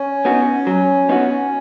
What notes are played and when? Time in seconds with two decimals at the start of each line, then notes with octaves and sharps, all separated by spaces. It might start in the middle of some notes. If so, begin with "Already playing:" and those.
Already playing: C#4
0.25 B3 D#4 F#4
0.67 F#3
1.09 B3 D#4 F#4